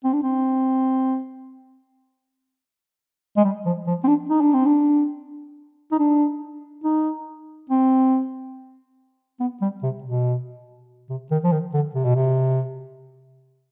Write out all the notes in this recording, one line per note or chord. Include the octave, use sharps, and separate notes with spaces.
C4
D4
C4
G#3
G3
F3
F3
C4
D4
D#4
D4
C4
D4
D#4
D4
D#4
C4
B3
G3
C3
B2
C3
D#3
F3
D#3
D3
C3
B2
C3